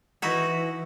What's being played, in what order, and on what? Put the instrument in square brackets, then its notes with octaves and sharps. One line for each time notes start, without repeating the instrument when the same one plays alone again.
[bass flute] E3 [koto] D#4 E4 F#4